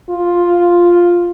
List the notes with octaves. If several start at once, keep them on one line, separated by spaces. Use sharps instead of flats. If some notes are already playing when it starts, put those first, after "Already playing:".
F4